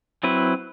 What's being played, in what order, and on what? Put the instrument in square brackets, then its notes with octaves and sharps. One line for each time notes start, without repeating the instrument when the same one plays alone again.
[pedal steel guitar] F#3 C4 E4 B4